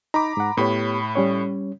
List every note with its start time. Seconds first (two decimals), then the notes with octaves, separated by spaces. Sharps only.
0.14 D#4 A#5 B5 D6
0.37 G#2 F#5
0.57 A2 B3 G4 C#5 B5
1.15 G3 C#4 C#5